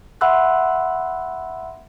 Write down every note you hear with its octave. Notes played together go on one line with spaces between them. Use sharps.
E5 F#5 B5 C6 E6 F#6